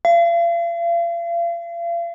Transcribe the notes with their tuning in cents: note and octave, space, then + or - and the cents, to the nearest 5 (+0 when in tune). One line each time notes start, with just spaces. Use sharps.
F5 -40